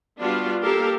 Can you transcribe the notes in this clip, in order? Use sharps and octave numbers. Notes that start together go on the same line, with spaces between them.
G3 B3 D4 F4 F#4
A#3 G4 A4 A#4 F5